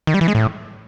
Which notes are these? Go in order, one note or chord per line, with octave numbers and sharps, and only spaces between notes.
D#3
G3
E3
G#3
A2